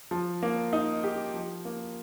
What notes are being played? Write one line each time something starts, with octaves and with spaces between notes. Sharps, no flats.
F3
A#3
D#4
G4
F3
A#3